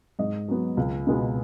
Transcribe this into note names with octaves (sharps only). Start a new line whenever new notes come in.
G#2 D#5
F#3 B3
C#2
B2 G#3 B3